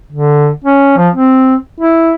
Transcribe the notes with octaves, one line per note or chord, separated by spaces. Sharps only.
D3
C#4
F3
C4
E4